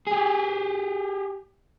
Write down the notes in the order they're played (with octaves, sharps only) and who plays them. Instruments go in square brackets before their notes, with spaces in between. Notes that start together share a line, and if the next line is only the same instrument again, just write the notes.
[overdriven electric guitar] G4 G#4